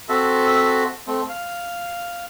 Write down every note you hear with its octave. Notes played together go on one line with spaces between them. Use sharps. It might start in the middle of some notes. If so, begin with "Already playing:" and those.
C4 F#4 A4 E5
A3 C4
F5